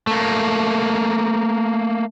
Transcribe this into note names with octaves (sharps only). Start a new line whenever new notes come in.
A3 A#3